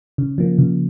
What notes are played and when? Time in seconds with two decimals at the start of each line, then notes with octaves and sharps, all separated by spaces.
0.18 C#3
0.38 F3 A#3
0.58 C#3